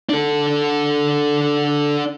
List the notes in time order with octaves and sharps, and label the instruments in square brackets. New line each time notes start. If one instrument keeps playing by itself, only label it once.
[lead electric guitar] D4 A4